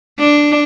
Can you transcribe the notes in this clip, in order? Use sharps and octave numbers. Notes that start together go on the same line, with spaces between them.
D4